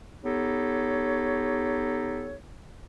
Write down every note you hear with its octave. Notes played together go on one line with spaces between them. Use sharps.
B3 D#4 G4 A4 C#5